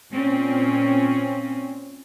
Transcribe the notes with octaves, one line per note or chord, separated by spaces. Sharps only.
A#2 C4 C#4